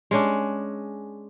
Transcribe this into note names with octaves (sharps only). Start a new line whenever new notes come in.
G#3 C#4 D4